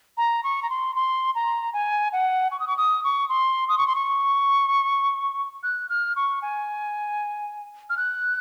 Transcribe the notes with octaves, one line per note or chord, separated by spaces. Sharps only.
A#5
C#6
A#5
C6
C6
A#5
G#5
F#5
C#6
D#6
C#6
D#6
C#6
C6
D#6
C#6
C6
C#6
F#6
F6
C#6
G#5
F6
F#6